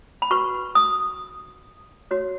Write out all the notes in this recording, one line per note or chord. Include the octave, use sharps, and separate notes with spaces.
B5
F#4 B4 C#6
D#6
F#4 C#5